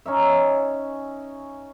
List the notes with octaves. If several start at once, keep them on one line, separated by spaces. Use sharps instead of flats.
C#4 D#4 E5